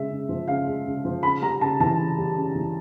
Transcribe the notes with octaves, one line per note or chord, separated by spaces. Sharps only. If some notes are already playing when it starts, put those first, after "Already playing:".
Already playing: C#3 G#3 E5
C#3
F3
C#3 F5
G#3
C#3
F3
C#3 B5
G3 A#5
C#3 A5
E3 A5
C#3
G3
C#3
E3